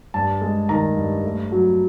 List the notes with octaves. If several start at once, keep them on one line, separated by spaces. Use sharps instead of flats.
G2 A5
G#3
D#3 A#5
G2
A3
F#3